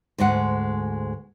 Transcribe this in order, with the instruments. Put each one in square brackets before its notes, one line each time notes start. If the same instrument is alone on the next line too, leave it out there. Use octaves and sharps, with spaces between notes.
[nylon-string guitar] D2 G#2 G#3 F#5